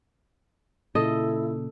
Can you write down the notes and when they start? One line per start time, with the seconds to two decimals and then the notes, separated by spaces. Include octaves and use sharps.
0.95 A#2 C#3 E4 A4 D#5